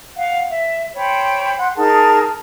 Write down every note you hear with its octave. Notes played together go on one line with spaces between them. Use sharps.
F5 F#5
E5
C5 C#5 G5 B5
F#5 C6
D#4 G#4 A#4 A5